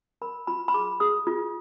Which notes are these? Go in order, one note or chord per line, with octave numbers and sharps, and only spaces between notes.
A#4 B5
F4 B5
B5
G#4 D6
G#4 D#6
F4